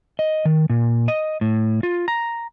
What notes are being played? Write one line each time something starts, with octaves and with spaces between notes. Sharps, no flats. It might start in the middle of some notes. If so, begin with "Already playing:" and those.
D#5
D#3
A#2
D#5
A2
F4
A#5